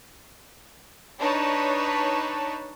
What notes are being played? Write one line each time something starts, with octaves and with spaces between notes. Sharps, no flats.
D4 D#4 B4 C#5 A5